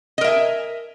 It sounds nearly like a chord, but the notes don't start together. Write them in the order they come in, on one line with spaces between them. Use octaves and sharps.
D#5 A#4 E5 G#5